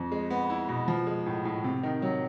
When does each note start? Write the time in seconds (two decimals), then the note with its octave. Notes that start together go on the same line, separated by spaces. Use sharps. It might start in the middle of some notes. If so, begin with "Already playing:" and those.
Already playing: F2
0.12 G#3
0.30 B3
0.50 E4
0.69 B2
0.88 F3
1.07 G#3
1.26 A2
1.45 A2
1.64 C3
1.83 D#3
2.02 F#3